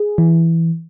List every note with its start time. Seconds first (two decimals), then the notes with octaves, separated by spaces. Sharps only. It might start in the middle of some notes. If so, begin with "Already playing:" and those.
Already playing: G#4
0.18 E3